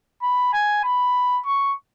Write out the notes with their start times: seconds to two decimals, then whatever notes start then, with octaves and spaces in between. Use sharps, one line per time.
0.22 B5
0.53 G#5
0.84 B5
1.46 C#6